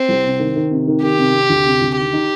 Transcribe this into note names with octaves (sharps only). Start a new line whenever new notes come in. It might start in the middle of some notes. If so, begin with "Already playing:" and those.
Already playing: C4
C2
C3
D#3
D#3
C3
D#3
D#3 G4
C3
C3
D2
C3
D2
D#3 G4
D#4